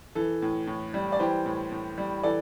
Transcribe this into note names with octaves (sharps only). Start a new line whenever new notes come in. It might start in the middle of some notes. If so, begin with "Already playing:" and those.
E3 A4
A2
A2
G3
D5
E3 G4 C5
A2
A2
G3
E3 A4 D5